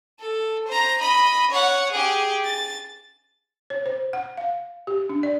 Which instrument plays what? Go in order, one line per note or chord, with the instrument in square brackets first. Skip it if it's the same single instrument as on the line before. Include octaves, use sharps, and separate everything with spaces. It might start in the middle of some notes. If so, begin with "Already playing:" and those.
[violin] A4
C5 A#5
D#5 B5
C#5 F#5
G4 G#4
A6
[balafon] C#5
C5
F#5
F5
G4
D4
D5